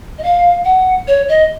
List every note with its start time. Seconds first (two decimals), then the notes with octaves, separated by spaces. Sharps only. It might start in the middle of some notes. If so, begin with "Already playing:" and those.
0.18 D#5
0.23 F5
0.65 F#5
1.08 C#5
1.29 D#5